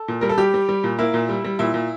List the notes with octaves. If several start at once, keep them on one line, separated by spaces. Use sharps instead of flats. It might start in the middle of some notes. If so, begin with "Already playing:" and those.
Already playing: A4
A#2
G3 A#4
A4
G3 G4
G3
G3
A#2
A#3 E4
A#2
G3
G3
A#2 E4
A#2